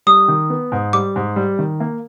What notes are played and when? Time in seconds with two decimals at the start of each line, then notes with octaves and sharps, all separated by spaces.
0.07 G3 D#6
0.28 D#3
0.50 B3
0.72 G#2
0.93 G3 D6
1.16 G#2
1.36 G3
1.59 D#3
1.80 A#3